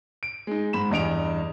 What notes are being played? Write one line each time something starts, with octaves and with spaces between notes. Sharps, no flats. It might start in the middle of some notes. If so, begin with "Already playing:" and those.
D7
G#3 D#4
G#2 B5 E7
E2 G2 D#5 D7 F7